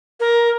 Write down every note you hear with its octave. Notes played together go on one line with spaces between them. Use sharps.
A#4